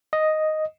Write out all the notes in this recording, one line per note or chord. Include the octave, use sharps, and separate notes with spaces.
D#5